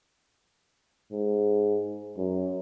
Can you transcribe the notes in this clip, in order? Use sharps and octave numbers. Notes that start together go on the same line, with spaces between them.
G#2
F#2